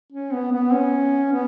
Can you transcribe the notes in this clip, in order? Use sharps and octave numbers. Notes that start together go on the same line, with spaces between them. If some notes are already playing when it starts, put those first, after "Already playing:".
C#4
B3
B3
C#4
B3